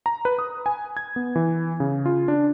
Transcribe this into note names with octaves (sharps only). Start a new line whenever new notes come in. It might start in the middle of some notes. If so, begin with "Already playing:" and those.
A#5
B4
D#6
G#5
G#6
B3
E3
C#3
F4
D4